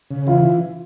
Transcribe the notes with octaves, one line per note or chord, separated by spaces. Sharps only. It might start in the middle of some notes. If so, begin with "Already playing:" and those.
C#3
E3 F4